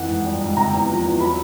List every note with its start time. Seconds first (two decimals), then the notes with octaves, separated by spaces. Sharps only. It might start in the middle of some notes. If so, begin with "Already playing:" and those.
Already playing: F2 E3 F#5
0.08 G#2
0.25 G3
0.41 G#2
0.57 C3 A#5
0.73 E2
0.89 F3
1.04 E2
1.20 F#3 B5